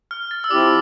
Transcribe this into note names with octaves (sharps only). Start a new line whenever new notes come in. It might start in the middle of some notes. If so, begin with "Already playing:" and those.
F6
A6
E6
F3 C4 E4 G4 D5 D6